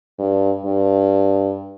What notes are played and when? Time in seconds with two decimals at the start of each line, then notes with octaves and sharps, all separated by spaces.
0.19 G2
0.65 G2